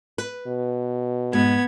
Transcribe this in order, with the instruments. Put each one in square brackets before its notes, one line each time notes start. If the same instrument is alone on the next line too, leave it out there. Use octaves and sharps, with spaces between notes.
[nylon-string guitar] B4
[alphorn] B2
[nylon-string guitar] G#2 [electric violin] B3 G#6